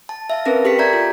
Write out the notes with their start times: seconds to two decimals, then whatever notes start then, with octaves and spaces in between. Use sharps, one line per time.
0.09 A5
0.30 E5 F5 A5
0.45 C4 C#4 A#4 B4 A#6
0.65 G4 A4 B6 C#7
0.79 D5 E5 A#5 G6 G#6
0.93 F4